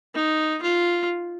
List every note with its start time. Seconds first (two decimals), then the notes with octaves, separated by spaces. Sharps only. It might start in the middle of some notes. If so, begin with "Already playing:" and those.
0.15 D#4
0.62 F4